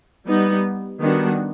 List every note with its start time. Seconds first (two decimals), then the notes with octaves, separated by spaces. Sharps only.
0.27 G3 B3 D#4
1.00 D#3 G3 B3 D4 F#4